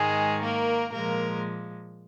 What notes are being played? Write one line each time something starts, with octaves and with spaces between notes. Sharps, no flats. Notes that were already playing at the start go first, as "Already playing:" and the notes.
Already playing: G#2 D#3 G#3 G#4
A#3 A#4
A#2 F3 G#3 A#3 A#4